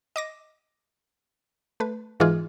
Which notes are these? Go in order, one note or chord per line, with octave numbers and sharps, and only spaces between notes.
D#5 D6 A#6
A3 B4
G#2 E3 G#3 D#4 F4 G#4